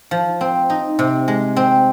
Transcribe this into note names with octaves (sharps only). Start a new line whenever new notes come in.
F3
C4
D#4
C3
G#3
C4